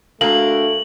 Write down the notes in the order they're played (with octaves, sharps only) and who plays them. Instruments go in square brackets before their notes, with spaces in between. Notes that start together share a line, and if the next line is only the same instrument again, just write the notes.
[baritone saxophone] D2 [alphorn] A3 [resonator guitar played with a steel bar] A#3 [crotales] F#7